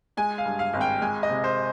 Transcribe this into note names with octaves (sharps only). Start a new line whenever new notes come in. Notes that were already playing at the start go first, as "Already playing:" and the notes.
G#3 G#5
F5
G2
F5
G#1
G5
G#3 G#5
D#5
C3
C5